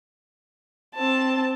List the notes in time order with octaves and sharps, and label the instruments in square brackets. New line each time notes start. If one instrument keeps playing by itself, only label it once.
[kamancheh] C4 A5